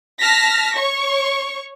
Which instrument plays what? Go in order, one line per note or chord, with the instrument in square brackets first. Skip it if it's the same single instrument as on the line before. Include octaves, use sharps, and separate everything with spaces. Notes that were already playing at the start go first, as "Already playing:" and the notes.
[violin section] A5 F6 A#6 B6
C#5 C#6